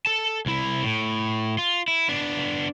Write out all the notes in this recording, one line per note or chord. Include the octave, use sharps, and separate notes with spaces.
A4 A5
C2 E4
A2
F4
E4
B3 D4